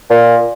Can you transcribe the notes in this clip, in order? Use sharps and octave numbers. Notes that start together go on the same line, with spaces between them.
A#2